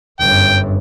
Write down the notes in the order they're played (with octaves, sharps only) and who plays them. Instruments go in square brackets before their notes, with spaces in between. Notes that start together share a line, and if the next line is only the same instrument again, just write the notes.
[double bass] G1 F#2 [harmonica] G5